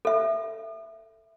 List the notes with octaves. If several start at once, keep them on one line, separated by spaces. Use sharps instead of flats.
A4 E5